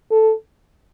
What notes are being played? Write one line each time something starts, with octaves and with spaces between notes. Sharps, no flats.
A4